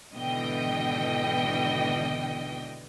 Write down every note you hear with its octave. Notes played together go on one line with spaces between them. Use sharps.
G#1 B2 D3 E3 D#5 G5